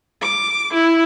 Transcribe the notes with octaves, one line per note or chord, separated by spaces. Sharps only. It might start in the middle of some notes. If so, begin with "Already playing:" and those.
D6
E4